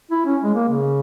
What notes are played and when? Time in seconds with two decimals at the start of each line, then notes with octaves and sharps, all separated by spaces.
0.11 E4
0.26 C#4
0.43 G#3
0.55 A#3
0.69 C#3